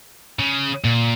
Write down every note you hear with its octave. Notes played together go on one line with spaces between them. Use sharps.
C#3
A#2